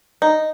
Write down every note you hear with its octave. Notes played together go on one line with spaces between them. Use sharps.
D#4